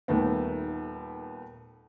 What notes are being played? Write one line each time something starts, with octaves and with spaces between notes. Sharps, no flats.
D#1 D#2 A3 B3